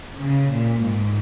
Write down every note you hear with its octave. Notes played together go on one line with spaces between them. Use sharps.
C#3
A#2
G#2